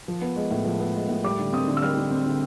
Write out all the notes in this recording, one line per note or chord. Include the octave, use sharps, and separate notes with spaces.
F3
B3
G#3
A2
F3
B3
G#3
A2
G3 D6
D3
C4 D#6
D3
E6
G3 F6
D3
C4
D3